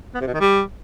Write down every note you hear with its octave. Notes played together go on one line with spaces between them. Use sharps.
B3
C3
B2
D#3
G3